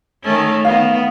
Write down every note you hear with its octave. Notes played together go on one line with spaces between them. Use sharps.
D#3 A3 C#4
D#3 B3 F5